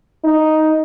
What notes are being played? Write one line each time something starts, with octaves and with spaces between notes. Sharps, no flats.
D#4